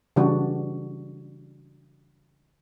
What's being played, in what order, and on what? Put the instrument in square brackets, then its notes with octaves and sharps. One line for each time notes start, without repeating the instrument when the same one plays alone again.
[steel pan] C#3 E3 G3 D4 F#4